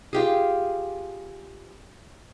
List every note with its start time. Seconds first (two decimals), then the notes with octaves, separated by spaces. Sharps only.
0.13 F4 G4 G#4